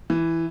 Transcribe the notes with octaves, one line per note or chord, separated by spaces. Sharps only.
E3